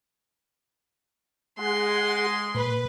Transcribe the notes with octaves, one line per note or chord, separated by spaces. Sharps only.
G#3 G#4 F#5 C6
A#2 B4